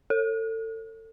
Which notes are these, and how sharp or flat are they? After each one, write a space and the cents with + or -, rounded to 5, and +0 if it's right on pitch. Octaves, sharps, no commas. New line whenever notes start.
A4 +30